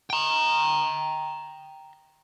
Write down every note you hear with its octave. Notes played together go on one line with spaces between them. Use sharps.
G5 A#5